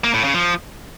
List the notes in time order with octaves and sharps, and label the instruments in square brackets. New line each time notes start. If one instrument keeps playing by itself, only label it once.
[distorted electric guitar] A#3
A2
C#3
F3